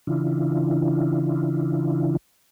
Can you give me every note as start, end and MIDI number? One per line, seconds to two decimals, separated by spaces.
0.07 2.17 49
0.07 2.17 52
0.07 2.17 62
0.07 2.17 64
0.07 2.17 65